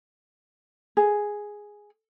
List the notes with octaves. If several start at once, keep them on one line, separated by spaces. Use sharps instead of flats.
G#4